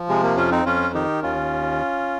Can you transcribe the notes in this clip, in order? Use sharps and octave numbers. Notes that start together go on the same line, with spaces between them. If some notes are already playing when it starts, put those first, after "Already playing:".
Already playing: F3
C3 G#3
A#3
F2 C#4 F4
C4 D#4
F2 C#4 F4
D#3 D#4 G4
D#2 C#4 F4